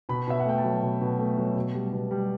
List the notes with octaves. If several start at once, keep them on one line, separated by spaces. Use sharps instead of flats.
B2 B5
B2 E5
F#5
A3 G5
A5
F#3
B2
B2
A3
F#3
B2
G3
B2
G3